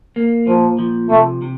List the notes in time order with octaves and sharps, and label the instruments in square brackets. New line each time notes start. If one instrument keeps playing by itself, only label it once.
[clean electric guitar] A#3
[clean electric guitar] A#2 [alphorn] F3
[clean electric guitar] F3
[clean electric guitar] C3 [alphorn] A3
[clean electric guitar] C3